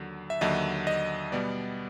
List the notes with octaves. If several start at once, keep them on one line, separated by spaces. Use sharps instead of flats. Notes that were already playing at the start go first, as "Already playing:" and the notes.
Already playing: D#2 D3 F#3
E5
D#2 D3 F#3 D#5
D#5
B2 G3 B3 D5